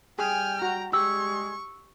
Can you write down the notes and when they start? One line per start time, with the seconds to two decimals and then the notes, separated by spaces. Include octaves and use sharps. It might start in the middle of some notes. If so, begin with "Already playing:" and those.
0.19 G3 G#4 G5 G#5 F6
0.62 F#4 A#5
0.93 G3 G#3 G4 G#4 C#6 E6